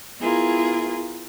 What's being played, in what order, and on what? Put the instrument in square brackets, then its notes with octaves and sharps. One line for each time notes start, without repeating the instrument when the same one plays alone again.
[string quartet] B3 E4 F4 G#4 A#4